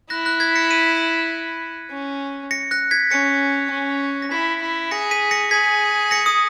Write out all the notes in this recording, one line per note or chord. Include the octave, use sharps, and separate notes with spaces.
E4 F#6 A#6
F#6 A#6
G#6 B6
A#6 C#7
B6 D#7
C#4
A#6 C#7
F#6 A#6
G#6 B6
C#4 A#6 C#7
C#4
A#6
E4 G#6 B6
E4
G#4 A#6 C#7
B6 D#7
A#6 C#7
G#4 G#6 B6
A#6 C#7
D#6